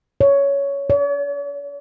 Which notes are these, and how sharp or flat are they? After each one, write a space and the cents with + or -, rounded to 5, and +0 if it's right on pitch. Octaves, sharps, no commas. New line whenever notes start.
C#5 +10
C#5 +45